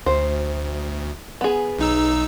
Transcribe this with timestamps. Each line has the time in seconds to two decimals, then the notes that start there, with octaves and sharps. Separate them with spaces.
0.06 D2 C5
1.41 B3 G#4
1.79 B1 D#4 E6